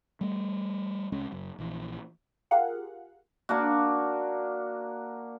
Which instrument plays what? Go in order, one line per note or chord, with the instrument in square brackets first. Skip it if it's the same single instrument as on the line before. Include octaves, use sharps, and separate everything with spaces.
[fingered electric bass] G3 A3
C2 G#3 C#4
F#1 F#2
A#1 E3
[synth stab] F4 G4 G#4 A#4 F5 F#5
[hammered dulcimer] A#3 D4 F#4